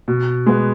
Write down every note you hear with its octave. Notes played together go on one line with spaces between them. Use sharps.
B2
G#3 B3